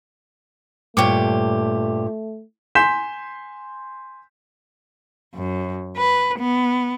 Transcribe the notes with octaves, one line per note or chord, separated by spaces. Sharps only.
G2 A#2 A3 G4 C#5 D6
G#5 C6 G6 B6 E7
F#2
B4
B3